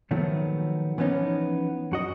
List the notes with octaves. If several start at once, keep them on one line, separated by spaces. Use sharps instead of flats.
A#2 D#3 F3 F#3 A3 B3
E3 F3 B3 C#4 D#4
F#2 F#4 D#5